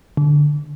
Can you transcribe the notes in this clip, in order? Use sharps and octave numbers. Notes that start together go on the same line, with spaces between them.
D3